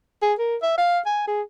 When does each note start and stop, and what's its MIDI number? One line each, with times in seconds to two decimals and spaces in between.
0.22 0.33 68
0.39 0.56 70
0.62 0.73 76
0.77 0.99 77
1.06 1.25 80
1.27 1.41 68